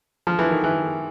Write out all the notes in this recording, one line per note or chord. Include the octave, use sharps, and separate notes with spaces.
F3
E3
D#3
E3